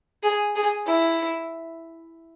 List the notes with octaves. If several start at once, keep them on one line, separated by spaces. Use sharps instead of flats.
G#4
G#4
E4